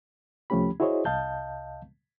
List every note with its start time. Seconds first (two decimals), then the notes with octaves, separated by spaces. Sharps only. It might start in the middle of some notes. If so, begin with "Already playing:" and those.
0.50 C2 F3 A3 C#4 G4 B5
0.80 E4 F#4 G#4 C5 C#5 D#5
1.05 C2 D#5 F5 A5 G6